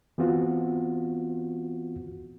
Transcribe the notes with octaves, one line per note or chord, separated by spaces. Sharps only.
E3 B3 C4 F4 F#4